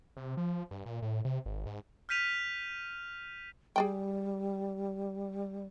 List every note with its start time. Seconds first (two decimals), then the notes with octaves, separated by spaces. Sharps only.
0.17 C3
0.37 F3
0.71 G2
0.86 A#2
1.02 A2
1.25 C3
1.46 G#1
1.66 G#2
2.09 F6 G6 B6 D#7 F7
3.76 G3 G#4 D5 G5